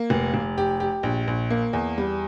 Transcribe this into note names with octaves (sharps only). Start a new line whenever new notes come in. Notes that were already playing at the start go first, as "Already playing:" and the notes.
Already playing: A#3
F1
F1
G4
G4
A#1
A#1
A#3
E2
G3